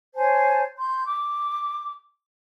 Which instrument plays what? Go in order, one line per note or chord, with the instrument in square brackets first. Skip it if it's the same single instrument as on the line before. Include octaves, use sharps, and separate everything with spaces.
[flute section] C5 C#5 G#5 A5
C6 G6
D6